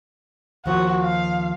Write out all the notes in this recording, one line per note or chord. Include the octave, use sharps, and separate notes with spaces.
D#2 F3 F#4
F5